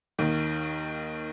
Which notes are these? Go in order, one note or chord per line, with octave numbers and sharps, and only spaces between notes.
D#2 D#3